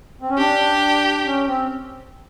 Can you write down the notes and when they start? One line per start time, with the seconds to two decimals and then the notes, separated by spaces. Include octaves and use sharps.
0.22 C4
0.30 C#4
0.38 D4 G4
1.26 C#4
1.47 C4